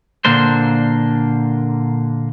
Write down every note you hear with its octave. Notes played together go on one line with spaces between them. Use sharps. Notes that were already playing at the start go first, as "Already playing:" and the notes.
A#2 D3 A#3 D4 C5